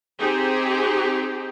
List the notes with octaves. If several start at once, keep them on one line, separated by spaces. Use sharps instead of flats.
C4 D#4 G4 G#4